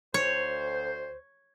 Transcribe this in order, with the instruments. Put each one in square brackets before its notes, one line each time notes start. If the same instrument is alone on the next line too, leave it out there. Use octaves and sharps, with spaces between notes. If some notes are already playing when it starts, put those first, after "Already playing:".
[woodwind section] D2 C5 [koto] C#5